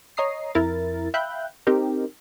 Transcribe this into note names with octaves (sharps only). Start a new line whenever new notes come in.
C#5 D#5 A#5 D#6 C7
F2 E4 A#4 A6
E5 F5 G5 B5 F#6 G6
C4 D#4 G4 A#4